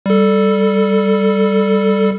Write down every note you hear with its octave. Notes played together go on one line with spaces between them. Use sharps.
G3 A4